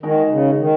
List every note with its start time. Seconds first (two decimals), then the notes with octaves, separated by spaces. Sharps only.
0.03 D#3 G#3 D#4 F#4 A#4
0.31 C#3
0.59 D#3